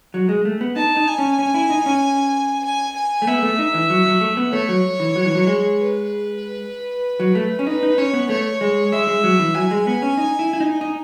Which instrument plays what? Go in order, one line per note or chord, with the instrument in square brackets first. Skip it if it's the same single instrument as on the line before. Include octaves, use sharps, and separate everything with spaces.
[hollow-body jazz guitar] F#3
G#3
A3
B3
[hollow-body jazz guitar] D#4 [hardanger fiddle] A5
[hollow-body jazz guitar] D#4
[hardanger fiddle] G#5
[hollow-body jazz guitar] C#4
C#4
E4
D#4
C#4
[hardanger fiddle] G#5
G#5
[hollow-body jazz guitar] A3
[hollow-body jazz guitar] B3 [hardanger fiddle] E5
[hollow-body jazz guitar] A3
D#4
E3
F#3
F#3
A3
B3
[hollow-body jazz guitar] A3 [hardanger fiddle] C#5
[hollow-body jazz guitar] F#3
E3
F#3
E3
F#3
G#3
[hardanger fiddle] B4
[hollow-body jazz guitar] F#3
A3
C#4
[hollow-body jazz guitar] D#4 [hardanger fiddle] B4
[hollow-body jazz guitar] D#4
[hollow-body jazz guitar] C#4 [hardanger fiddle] C#5
[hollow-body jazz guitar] B3
[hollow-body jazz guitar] A3 [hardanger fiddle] C#5
[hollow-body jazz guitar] G#3
[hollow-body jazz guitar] G#3 [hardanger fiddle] E5
[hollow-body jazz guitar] G#3
F#3
E3
[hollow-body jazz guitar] F#3 [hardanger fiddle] G#5
[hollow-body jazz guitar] G#3
B3
C#4
D#4
E4
E4
D#4
D#4